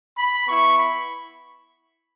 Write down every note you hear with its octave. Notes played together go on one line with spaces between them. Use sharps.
B5
B3 E4 C#6
B5